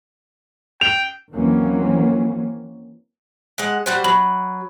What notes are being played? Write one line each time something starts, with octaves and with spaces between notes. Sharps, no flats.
G5 F7
D#2 E3 F#3 A#3 C4 C#4
G#3 F#5
G3 F#4 C5
F#3 B5